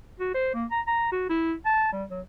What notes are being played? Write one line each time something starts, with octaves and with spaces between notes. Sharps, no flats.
F#4
C5
A#3
A#5
A#5
F#4
E4
A5
G3
F#3